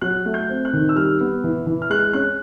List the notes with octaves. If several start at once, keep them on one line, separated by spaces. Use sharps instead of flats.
F#3 F#6
A3
G6
C4
F#6
D#3
E6
G3 F6
B3
E3
E3
F6
G#3 F#6
C#4 F#6